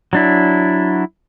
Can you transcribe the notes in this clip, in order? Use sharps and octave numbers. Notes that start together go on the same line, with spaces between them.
F#3 D4 E4